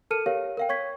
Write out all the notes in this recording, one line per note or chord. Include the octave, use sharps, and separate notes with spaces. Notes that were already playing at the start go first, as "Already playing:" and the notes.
A4 A#4 A5 F6 C#7 D#7
G4 A#4 C#5 F5
A#4 F5 G5
C#5 C#6 G#6 B6